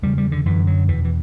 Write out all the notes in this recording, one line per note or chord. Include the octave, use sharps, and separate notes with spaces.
E2 C#3 G3
G3
D3
F#2 D3 E3
F#3
E2 B2 E3
E3